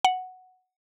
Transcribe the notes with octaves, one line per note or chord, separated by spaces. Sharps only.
F#5